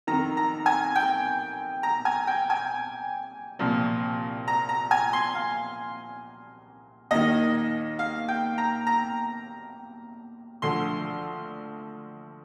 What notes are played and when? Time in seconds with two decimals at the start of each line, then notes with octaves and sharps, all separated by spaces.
0.07 F2 D#3 A#5
0.37 A#5
0.66 G#5
0.96 G5
1.83 A#5
2.05 G#5
2.27 G5
2.50 G#5
3.59 C2 A#2 F3
4.48 A#5
4.69 A#5
4.91 G#5
5.13 C6
5.35 F5
7.11 D#2 D#3 D#5
7.99 F5
8.28 G5
8.58 A#5
8.87 A#5
10.62 D2 D3 F3 C6